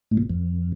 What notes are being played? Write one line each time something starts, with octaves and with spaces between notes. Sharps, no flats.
A2
A#2
F2